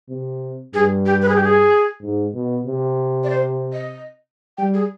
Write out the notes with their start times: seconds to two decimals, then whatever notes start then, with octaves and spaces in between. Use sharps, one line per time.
0.09 C3
0.74 G2 G#4
1.06 G4
1.22 B4
1.28 G#4
1.36 G4
1.43 G#4
2.01 G#2
2.34 B2
2.66 C3
3.24 D5
3.30 C5
3.73 D#5
4.58 G3 G5
4.74 G#4